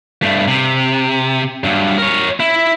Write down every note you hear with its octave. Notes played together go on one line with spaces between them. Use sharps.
G2 A3
C3
G2 F#3
A#4 C#5
E4